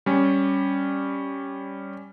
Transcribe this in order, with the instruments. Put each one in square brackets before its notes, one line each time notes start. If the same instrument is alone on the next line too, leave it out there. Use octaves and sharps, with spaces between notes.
[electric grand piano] G3 C#4